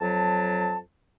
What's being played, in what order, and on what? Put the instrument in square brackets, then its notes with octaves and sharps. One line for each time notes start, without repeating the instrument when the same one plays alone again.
[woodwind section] F2 F#3 A5